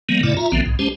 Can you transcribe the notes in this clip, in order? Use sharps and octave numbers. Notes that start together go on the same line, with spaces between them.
D#3 F#3 G#3 A#3 B3
G2 A#2 C#3 A3 E4 D5
F4 E5 A#5
A#1 D3 F3 B3 C4
B1 G#2
G#3 C#4 G4 C5 A5